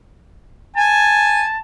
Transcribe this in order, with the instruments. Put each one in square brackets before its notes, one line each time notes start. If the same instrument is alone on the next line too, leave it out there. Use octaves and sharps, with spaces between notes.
[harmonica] G#5 [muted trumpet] A5